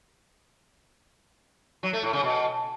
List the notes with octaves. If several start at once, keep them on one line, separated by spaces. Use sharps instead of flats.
F#3
A3
A2
C#3
B2